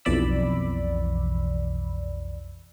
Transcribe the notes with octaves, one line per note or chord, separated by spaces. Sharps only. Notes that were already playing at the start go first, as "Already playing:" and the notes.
B1 F2 E3 D5 B5 E6